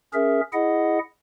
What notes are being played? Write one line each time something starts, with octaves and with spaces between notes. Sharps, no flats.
C#4 G#4 A#4 E5
E4 G#4 D#5 F#5